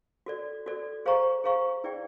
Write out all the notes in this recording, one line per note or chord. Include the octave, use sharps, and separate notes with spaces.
F#4 A4 D5
F#4 A4 D5
G#4 C5 F5 A#5 C#6
G#4 C5 F5 A#5 C#6
E4 G#4 B4 D5 G5